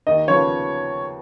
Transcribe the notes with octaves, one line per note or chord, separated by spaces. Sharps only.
D#2 D#5
C#3 F3 B3 C#5